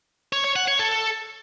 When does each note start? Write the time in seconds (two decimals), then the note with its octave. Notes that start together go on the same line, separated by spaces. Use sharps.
0.33 C#5
0.44 C#5
0.56 F#5
0.68 C#5
0.79 A4